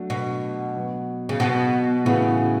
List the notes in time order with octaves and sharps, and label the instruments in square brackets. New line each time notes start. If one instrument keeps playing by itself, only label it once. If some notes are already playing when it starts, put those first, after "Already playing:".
Already playing: [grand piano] F#3 A3 D4 F#4
[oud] B2
[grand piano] F#3 B3 F#4
[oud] C#3
B2
[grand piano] A2 E3 B3 F#4 [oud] C#3